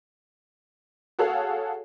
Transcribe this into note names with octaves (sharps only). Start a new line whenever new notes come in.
F#4 G#4 A4 C#5 F5 F#5